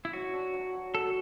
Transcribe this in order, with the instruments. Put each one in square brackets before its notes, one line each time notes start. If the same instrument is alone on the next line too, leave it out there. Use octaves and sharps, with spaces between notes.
[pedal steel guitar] E4
[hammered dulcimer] F#3 [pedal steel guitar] F#4
[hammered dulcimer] D4
F#3
F#3
[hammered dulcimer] F#3 [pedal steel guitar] A4